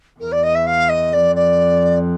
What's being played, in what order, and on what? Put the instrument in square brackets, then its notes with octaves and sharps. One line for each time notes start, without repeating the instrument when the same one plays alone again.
[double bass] E2 [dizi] A#4
[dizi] D5
D#5
E5
F5
D#5
[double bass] F2 [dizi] D5
[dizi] D5